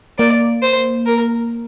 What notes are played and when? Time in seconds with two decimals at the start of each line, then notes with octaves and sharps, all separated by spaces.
0.19 A#3 D5
0.62 C5
1.06 A#4